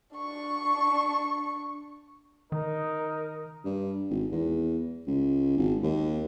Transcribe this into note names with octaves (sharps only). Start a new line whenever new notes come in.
D4 C#6
D#3 D#4 A#4
G2
G#1
E2
C#2
G#1
D#2